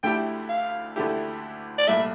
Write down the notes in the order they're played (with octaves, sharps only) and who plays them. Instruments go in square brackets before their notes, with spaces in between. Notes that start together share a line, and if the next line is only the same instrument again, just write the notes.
[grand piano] D2 D3 A3 E4 G4 [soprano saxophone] G5
[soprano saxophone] F5
[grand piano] D2 D3 A3 E4 G4
[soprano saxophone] D5
[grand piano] C2 A#2 A3 [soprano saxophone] E5